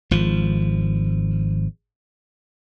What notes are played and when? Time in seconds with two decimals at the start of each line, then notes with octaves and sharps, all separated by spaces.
0.11 G#1 F3